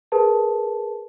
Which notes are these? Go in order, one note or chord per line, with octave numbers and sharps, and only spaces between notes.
G#4 A#4 B4 A5